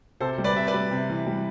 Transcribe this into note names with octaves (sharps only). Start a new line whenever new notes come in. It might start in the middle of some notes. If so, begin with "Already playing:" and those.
C3 A4 C5
G3
B4 D5
C3 E5
B4 D5
G3
C3
E3
G3